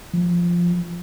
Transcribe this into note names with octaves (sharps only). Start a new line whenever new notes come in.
F3